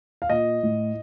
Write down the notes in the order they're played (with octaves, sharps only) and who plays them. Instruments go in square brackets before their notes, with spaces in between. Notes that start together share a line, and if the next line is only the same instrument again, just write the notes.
[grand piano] F5
A#2 D#5
A2